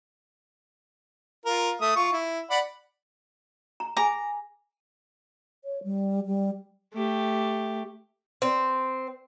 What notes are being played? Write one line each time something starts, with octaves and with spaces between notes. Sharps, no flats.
F4 A#4
A3 E5 D#6
F4 C#6
E4
D5 F#5 B5
A#5
G#4 G#5 A#5
C#5
G3
G3
A3 G4
C4